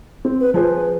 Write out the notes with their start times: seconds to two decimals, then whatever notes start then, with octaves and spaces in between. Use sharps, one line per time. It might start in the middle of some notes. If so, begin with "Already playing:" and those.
0.25 C4
0.41 B4
0.54 F3 G#4 B4 C5